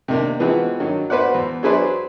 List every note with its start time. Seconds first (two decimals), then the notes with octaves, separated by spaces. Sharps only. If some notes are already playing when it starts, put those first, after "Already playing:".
0.08 C3 D#3 A#3 D4
0.40 E3 F3 G#3 B3 C4 F#4
0.80 G2 D#3 F#3
1.10 F#4 B4 C5 D5 F#5
1.34 E2
1.63 F#3 D4 G#4 B4 C5 D5